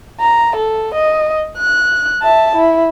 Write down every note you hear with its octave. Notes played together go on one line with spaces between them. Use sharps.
A#5
A4
D#5
F#6
E5 A5
E4